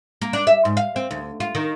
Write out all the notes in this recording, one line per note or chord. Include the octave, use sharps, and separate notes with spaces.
A#3
D4
E5
G#2
F5
C4
D2
F4
D#3